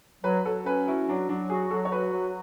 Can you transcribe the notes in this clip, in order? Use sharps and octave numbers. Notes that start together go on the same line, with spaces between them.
F#3 B4
F#3 A4
C#4 B4
E4 F#4
F#3 D4
F#3 D4
F#4 G#4
F#3 A4
C#5
F#4 B4
F#3